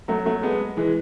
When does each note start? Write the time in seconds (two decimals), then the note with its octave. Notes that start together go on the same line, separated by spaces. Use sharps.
0.08 F#3 A3
0.26 F#3 A3
0.43 G#3 B3
0.77 E3 G#3